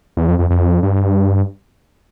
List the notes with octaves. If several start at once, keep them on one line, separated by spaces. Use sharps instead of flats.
E2
F2
F2
F2
G2